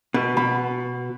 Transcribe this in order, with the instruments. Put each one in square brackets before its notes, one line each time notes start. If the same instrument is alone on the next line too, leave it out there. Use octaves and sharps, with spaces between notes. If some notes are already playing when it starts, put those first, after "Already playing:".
[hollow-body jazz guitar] B2 [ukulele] B4
[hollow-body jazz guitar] B2 [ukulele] B5